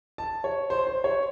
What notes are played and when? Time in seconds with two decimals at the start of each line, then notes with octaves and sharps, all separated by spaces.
0.18 A5
0.44 C#5
0.70 C5
0.87 C5
1.04 C#5